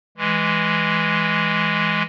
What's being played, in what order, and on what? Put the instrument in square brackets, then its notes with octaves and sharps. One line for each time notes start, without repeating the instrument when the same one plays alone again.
[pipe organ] E3 G#3